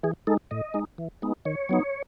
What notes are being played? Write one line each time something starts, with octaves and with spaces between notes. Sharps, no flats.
E3 G#4
G#3 D#4 A4
A2 D#5
G#3 D#4
E3
G#3 B3 D#4
D#3 C#5
F#3 B3 D#4